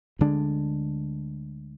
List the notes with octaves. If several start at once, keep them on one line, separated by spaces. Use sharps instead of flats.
D2 D3 G#3 D4